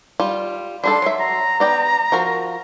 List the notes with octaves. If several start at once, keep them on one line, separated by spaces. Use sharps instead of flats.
G3 F4
G3 D4 A4 C6
F#3 E5
A#5
B3 D5 G5
F3 F#4 A#4